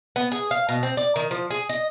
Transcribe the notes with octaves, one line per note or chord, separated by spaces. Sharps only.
B3
G#4
F5
B2
C4
D5
D#3
F3
G#4
D#5